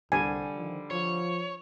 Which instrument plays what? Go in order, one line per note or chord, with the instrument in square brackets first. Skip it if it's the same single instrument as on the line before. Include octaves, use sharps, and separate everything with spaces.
[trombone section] C2 [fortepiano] D3 G3 [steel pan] G#5
[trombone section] D#3 F3
[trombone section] F3 [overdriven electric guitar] C#5